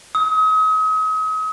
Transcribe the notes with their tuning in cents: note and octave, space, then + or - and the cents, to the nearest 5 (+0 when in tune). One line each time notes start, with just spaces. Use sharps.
D#6 +40